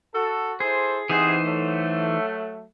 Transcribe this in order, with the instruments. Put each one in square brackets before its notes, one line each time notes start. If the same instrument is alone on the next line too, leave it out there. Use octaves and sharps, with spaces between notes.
[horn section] F#4 A4
[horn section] E4 A4 C5 [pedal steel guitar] G#4
[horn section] C3 B3 G#4 [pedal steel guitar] E3 D#4 C5
[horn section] F#3 A3